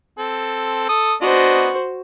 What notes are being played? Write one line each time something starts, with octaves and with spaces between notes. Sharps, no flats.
C4 A4
A4 D#6
B3 D4 F#4 C5 D#5